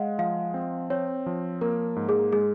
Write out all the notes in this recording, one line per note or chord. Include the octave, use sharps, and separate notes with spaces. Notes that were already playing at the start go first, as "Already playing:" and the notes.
Already playing: G#3 D#5 F5 F#5
F3 F5
C4
C4 C#5
F3
A#3 A#4
G#2
G#4
G#3 G#4